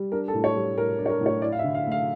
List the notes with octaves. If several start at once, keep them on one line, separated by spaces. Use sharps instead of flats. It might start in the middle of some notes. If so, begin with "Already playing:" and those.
Already playing: G3
D4 A#4
A4
A2
C#5
G3
A2 A#4
D4
C#5
A#4
A2
C#5
E4 D5
F5
E5
D3
F5
A3
F5